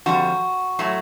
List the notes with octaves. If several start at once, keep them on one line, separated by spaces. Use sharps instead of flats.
F2 D3 G3 F#4
A2 F#3 A3